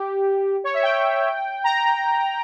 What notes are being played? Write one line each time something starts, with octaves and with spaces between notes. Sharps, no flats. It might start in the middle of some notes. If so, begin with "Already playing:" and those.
Already playing: G4
C#5
E5
G5
A#5